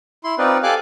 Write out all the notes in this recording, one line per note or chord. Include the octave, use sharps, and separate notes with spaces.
E4 C6
C4 D#4 F4 B4 D5
G4 A4 F5 G#5 D6 F#6